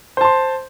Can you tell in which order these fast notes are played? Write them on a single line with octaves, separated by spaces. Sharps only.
C5 A5 C6